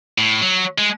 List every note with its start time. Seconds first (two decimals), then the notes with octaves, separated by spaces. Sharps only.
0.18 A2
0.42 F#3
0.78 G#3